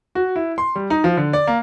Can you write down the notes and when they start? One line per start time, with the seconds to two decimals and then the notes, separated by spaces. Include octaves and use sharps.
0.15 F#4
0.36 E4
0.58 C6
0.76 G3
0.90 D#4
1.04 F3
1.17 D3
1.33 D5
1.47 A#3